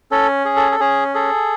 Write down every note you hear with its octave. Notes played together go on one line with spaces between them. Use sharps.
C#4 A4
G#4
A4
A4
C#4 G#4
G#4 A4